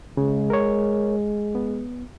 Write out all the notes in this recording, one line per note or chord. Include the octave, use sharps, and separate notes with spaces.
C#3 G#3
A#4 C#5
B3